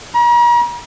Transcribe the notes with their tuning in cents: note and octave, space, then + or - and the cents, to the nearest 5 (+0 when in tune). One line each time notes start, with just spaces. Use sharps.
A#5 +40